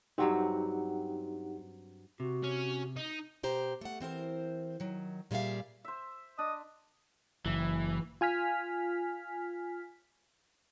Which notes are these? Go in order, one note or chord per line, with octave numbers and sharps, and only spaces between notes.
G2 F#3 C4 D#4 G4 F#5
C3 F#4
C#4
D#4
B2 G4 C5 A#5
A3 F#5
E3 C4 A#4 C5
D#3 F#3
A#2 G3 G#4 E5 F5
C5 E5
D4 D#5
F#1 E3
F4 G#5 F6 B6